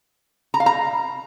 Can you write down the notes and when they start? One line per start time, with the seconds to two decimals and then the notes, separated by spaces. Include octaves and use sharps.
0.54 A#5
0.60 F5
0.66 A#5